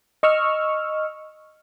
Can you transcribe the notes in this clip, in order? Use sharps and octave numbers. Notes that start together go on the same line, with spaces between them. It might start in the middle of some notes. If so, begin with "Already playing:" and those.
D#5 C#6 E6 F6